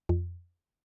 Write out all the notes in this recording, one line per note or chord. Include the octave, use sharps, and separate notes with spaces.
F2